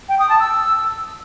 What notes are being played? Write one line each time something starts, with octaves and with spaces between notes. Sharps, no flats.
G5
D#6
A5
E6